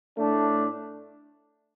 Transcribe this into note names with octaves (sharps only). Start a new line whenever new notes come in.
A2 A3 D4